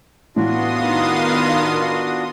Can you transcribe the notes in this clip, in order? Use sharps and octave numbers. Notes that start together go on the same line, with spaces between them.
A2 E3 B3 D4 F4 F#4 C6 D#6
D#3 A#4 F5